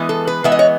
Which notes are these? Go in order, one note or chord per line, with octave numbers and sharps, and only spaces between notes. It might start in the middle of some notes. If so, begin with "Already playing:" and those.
Already playing: E3 G#3 B3
A4
B4
E3 G#3 B3 E5
D#5
C#5